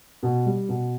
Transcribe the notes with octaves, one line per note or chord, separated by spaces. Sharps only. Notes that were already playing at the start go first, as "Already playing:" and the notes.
B2
G3
B2